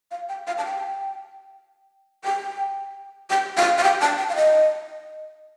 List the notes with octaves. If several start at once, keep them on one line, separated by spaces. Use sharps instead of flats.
F5
G5
F5
A5
G5
G5
G5
F5
F5
G5
A5
G5
F5
D#5